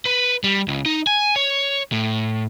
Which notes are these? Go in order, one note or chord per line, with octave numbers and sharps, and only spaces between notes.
B4
G3
C#2
D#4
G#5
C#5
A2